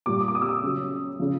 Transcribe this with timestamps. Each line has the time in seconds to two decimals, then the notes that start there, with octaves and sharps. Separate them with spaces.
0.06 A#2 G3 D6
0.21 D#6
0.28 D6
0.35 D#6
0.42 E6
0.49 D#6
0.63 C#3 F#3
1.19 C#3 F3